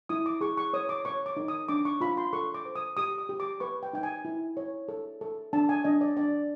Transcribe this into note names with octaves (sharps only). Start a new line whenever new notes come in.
E4 D#6
D6
G#4 C#6
C#6
C#5 D#6
D6
C#5 C#6
D6
D#4
D#6
D4 D6
C#6
F4 B5
C6
A4 C#6
D6
C5
D#6
G4 D#6
D#6
G4
D6
B4 C#6
G5
D#4 G5
G#5
E4
C#5
A4
A4
D4 A5
G#5
D4 D#5
D5
D4 D5